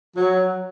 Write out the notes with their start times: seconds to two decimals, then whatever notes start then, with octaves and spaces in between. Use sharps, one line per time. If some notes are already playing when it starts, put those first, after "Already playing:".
0.16 F#3